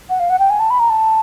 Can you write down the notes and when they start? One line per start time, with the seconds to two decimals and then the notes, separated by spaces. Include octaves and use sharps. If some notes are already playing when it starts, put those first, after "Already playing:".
0.10 F#5
0.20 F5
0.30 F#5
0.39 G5
0.50 G#5
0.59 A5
0.70 B5
0.79 A#5
0.90 A5